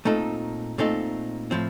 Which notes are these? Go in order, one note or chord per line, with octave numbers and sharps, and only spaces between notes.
A#2 A3 C4 D#4 A4
A#2 A3 C4 D#4 A4
A2 F3 C4